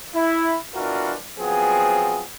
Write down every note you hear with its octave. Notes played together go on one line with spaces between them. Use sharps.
E4
B2 E3 D4 F4 F#4 A#4
F3 F#3 B3 C4 G#4